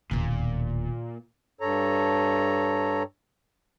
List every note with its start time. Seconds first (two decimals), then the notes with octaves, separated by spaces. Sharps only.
0.11 E1 D#2 A#2
1.61 G2 A4 C#5 A#5